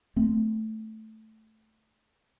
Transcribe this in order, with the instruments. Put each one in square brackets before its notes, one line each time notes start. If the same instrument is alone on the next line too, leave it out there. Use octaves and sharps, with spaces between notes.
[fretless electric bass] A3 C4